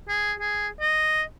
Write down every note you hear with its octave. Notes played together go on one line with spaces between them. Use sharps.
G#4
G#4
D#5